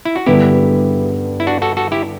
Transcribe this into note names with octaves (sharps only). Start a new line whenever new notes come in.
E4
F#4
G2 D3 G3 B3 E4 G4
E4
D4 F#4
F#4 A4
F#4 A4
E4 G4